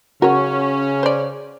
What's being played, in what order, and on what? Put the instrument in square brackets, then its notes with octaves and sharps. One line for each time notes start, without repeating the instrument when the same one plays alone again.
[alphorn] C#3 [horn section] C#4 [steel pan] F#4 [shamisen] A#4 C#5
[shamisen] C5 D5